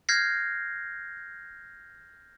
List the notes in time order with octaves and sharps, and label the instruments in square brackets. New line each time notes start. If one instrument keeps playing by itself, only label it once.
[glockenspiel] F6 G6 G#6 A#6 C7